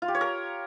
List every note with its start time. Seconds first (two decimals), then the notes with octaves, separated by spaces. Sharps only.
0.02 F4
0.08 G4
0.15 C#5
0.21 A#4